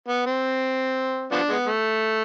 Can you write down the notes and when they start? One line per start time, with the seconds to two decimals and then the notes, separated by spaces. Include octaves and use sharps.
0.08 B3
0.26 C4
1.32 F3 B3 D4
1.49 G#3 B3
1.66 A3